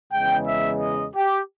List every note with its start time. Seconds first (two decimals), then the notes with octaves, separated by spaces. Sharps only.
0.12 E2 C#3 G#3 G5
0.47 E5
0.80 D#5
1.14 G4